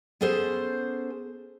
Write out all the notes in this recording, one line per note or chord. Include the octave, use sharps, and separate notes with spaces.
B3 C#4 G#4 A4 C5